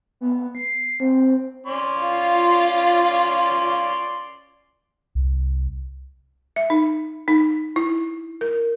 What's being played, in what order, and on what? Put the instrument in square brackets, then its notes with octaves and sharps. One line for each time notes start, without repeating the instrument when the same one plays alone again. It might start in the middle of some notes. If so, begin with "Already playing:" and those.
[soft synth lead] B3
C7
C4
[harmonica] C#4 D5 C6
[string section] F4
[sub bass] C2
[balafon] E5
D#4
D#4
E4
A#4